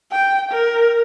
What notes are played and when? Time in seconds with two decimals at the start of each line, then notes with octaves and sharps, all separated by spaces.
0.12 G5
0.51 A#4